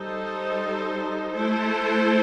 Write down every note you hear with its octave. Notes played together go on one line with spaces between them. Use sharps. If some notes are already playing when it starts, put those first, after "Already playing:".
Already playing: G3 D#4 A4 C5
A3 E4 A4 C5